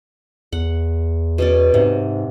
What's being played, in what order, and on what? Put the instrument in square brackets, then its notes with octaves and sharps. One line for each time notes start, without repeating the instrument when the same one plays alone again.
[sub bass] E2 [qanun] F#5
[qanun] B2 C#4 D5
[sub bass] G#2 [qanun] C3